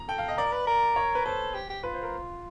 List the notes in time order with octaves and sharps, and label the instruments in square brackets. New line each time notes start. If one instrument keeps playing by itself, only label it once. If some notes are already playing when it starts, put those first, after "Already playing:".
Already playing: [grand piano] A#5
[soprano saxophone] A4 [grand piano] G5
[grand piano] F5
D#5
[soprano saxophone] A#4 [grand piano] D5
[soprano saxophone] B4
A#4
[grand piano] C#5
B4
[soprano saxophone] A4 [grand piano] C5
[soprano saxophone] G4
G4
[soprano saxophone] F4 [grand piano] B4
[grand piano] C5
A#4